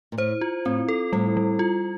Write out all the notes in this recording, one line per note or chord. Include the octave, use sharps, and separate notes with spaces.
A#2
A2 C5
F4
A2 C4
A4
A2 G3
G3
F4